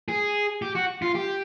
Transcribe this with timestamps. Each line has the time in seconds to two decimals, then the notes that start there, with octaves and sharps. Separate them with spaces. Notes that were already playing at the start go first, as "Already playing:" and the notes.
0.08 G#4
0.62 G4
0.75 F#4
1.02 F4
1.15 G4